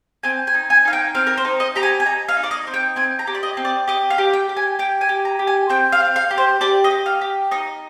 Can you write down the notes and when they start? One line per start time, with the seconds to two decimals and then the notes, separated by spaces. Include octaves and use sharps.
0.23 C4 G#5
0.47 G#5
0.54 D#4
0.70 G#5
0.85 D#4 F5
0.93 G5
1.15 C4 F5
1.27 A#4
1.38 C5
1.45 D#4
1.60 D#5
1.76 G4 A#5
1.83 G#5
2.00 G#5
2.06 D#4 A#5
2.29 F5
2.37 D#4
2.43 D5
2.51 D#5
2.67 C4
2.74 G5
2.96 C4 G#5
3.19 A#5
3.27 G4
3.35 D5
3.43 D#5
3.57 C4
3.65 D5
3.88 G4 D#5
4.10 F5
4.18 G4
4.33 G5
4.49 G4
4.57 G#5
4.79 G4 G5
5.01 G#5
5.09 G4
5.25 A#5
5.39 G4
5.47 G#5
5.70 C4 G5
5.92 F5
6.00 C4
6.16 F5
6.31 G4
6.38 C5
6.61 G4 D5
6.84 D#5
6.91 G4
7.06 F5
7.21 G4
7.51 D#4 D#5